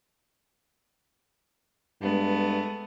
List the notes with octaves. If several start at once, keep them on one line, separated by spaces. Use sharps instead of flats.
G2 G#3 A3 B3